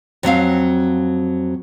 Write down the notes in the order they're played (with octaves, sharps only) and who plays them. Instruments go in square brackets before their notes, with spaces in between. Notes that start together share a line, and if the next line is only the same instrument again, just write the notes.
[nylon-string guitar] F2 F#3 C4 F5